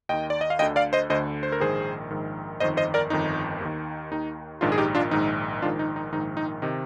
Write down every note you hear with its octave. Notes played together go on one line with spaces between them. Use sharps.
D#2 D#3 D#5 G5
D5
D#5
F5
D2 D3 D#5 G5
D5 F5
C5 D#5
D2 D3 C5 D#5
C5
A#4
A#1 G#2 D#3 G#4 C5
A#1 G#2 D#3
G1 F2 D#3 C5 D#5
C5 D#5
A#4 D5
G1 F2 D#3 D#4
D#2 D#3
D#2 D#3 D#4
A#1 G#2 D#3 D4 F4
G#4
D#4 G4
D4 F4
A#1 G#2 D#3 D#4
A#1 G#2 D#3 D4 F4
D#4
D#4
A#1 G#2 D#3 D#4
D#4
C3 D#3 D#4